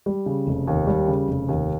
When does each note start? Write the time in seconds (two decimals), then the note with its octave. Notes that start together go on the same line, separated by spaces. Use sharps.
0.06 G3
0.26 C#3
0.47 F1
0.68 D#2
0.87 G3
1.08 C#3
1.28 F1
1.49 D#2